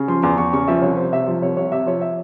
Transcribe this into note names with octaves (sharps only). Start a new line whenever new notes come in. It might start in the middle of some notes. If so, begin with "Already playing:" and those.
Already playing: C#3
F3 C6
E2 C6
E2 C#6
C#3 C#6
F3 E5
C2 C#5
C2 C5
C3 E5
F3
C2 C#5
C2 C#5
C3 E5
F3 C#5
E5